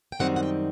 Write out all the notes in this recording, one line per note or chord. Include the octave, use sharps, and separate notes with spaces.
G5
F#2 D#3 G3 C4 D#4 F#5
F#5
G5